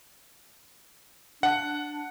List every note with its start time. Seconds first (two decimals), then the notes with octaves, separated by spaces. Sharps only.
1.43 D4 F#5